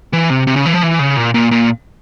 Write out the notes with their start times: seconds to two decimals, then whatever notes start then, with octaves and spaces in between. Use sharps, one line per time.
0.13 E3
0.30 C3
0.47 C3
0.56 C#3
0.66 E3
0.73 F3
0.83 E3
0.99 C#3
1.17 A#2
1.34 A#2
1.51 A#2